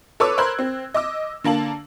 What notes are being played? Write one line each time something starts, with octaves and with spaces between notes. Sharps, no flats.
A4 B4 C#5 C#6 D6 E6
A#4 C5 B5 C6 F#6 G#6
C4
D#5 D6 E6
D3 A#3 A5 F#7